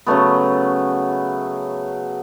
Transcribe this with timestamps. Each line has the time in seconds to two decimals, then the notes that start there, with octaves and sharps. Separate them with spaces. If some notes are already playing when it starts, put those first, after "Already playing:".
0.06 C#3 F#3 A3 B3